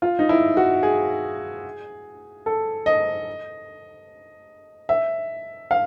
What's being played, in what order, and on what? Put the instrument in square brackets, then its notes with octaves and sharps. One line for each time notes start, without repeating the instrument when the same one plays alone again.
[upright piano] F4
D#4
E4
F#4
G#4
A4
D#5
E5
F5